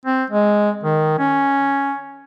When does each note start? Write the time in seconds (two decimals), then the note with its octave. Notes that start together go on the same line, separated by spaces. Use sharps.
0.05 C4
0.30 G#3
0.83 D#3
1.19 C#4